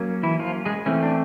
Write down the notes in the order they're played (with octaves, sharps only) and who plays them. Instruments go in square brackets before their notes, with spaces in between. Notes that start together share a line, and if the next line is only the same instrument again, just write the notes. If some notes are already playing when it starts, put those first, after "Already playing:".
Already playing: [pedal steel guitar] F#3 A#3 C#4
E3 E4
F3 F4
G#3 G#4
E3 A3 C4 C#4
D4